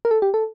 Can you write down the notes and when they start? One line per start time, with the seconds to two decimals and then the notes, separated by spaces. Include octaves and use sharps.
0.05 A#4
0.11 A4
0.22 G4
0.34 A4